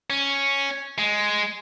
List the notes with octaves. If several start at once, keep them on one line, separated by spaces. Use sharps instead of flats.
C#4
G#3